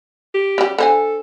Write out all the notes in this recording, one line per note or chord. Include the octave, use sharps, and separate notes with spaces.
G4
C#3 G3
D3 A4 C5 G#5